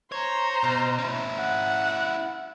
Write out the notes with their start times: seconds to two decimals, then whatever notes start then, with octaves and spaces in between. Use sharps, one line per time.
0.12 C5 C#5 A#5
0.63 B2
0.98 C#4 E4
1.37 F#5